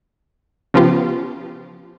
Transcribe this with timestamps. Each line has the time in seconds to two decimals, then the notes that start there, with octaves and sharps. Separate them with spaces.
0.74 C#3 F3 B3 F4 G4